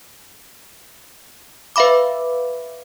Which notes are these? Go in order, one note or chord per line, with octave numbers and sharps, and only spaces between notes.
B4 E5 F5 B5 D6